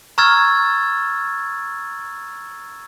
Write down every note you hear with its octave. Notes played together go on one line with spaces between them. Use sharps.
A#5 C#6 E6 F6 G#6 A6